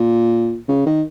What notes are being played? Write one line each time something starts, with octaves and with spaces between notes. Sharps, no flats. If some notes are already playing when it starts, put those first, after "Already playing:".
Already playing: A#2
C#3
D#3